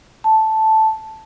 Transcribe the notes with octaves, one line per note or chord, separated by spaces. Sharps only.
A5